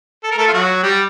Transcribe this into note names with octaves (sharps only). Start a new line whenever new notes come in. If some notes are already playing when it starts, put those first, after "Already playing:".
A4
A#4
A3 A4
F4
F#3 F#4
G3 G4